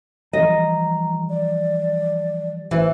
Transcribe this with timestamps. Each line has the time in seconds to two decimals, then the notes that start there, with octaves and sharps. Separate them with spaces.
0.33 E3 F3 G3 D#5 A#5
1.30 D5
2.71 A1 E3 C5